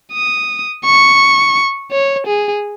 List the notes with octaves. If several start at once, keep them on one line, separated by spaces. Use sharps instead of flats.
D#6
C#6
C#5
G#4